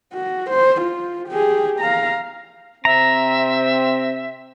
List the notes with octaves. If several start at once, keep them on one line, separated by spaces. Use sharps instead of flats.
F#4
C5
F4
G4 G#4
F5 A#5
C3 C4 E5 A#5